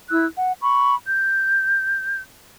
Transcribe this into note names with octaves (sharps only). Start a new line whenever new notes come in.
E4 E6 F#6
F#5
B5 C#6
G6